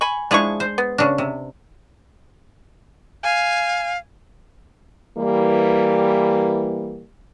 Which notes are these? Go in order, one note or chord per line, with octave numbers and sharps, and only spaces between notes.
G#5 B5 C#6
F3 G#3 D4 E4 G#4 C#6
C5
B3
C#3 D4
C3
F5 G#5
E3 G3 A#3